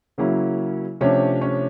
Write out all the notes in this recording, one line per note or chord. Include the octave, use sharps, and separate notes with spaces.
C#3 F#3 A#3 C#4 E4
C3 F3 A3 C#4 D4 C#5
C#4 C#5